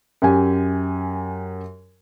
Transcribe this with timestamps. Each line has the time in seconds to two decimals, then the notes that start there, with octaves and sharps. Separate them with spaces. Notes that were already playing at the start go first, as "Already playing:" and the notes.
0.22 F#2 G4 G#5